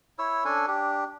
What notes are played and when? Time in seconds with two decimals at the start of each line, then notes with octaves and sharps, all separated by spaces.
0.19 E4 C#5 E6
0.45 C#4 D4 A4 G#5
0.68 D4 G4